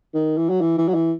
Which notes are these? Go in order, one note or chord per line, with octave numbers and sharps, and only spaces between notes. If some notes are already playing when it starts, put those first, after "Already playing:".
D#3
E3
F#3
E3
E3
F#3
E3